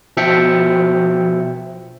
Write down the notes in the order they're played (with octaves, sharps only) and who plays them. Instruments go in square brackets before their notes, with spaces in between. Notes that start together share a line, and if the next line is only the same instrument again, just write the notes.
[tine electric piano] B2 F3 E5 G5 C#7